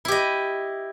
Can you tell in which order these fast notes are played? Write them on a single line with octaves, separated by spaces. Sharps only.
E4 G4 D#5